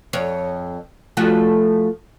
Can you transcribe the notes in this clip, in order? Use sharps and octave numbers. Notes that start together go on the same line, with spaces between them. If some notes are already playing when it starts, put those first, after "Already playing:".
F2 C#5
F3 A3 F#4